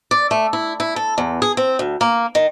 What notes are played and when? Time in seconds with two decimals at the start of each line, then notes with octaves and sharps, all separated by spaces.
0.11 D5
0.31 A3
0.53 E4
0.80 E4
0.96 A4
1.18 E2
1.42 G#4
1.57 C4
1.79 D2
2.01 A#3
2.35 D#3